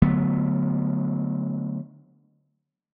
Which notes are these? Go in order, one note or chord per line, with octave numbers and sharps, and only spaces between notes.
D3 F#3 A3 B3